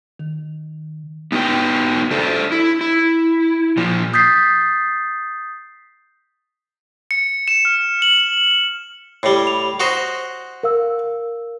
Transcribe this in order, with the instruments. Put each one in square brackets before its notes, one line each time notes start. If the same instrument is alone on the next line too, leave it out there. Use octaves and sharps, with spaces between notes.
[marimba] D#3
[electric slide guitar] B3 D#4 F#4 B4 G5
D4 A4 C5
E4
E4
A#2 F3
[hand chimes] D#6 G6 A6 B6 C7
[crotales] C#7
E7
F6
F#7
[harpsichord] A2 G3
[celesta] F7
[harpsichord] F#4 C5 D#5
[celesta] A#4 F5 E6